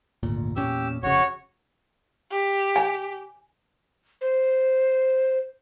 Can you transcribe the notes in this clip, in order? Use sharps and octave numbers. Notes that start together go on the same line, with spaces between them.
G#1 D2 A#2
E2 A#2 C#4 G4 E6
F1 C#3 F#4 C#5
G4
G#5
C5